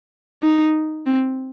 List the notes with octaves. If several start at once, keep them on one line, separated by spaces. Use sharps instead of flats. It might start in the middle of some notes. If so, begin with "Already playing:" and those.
D#4
C4